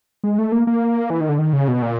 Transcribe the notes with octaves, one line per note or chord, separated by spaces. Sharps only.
G#3
A3
A#3
A#3
E3
D#3
D3
D#3
C#3
B2
A#2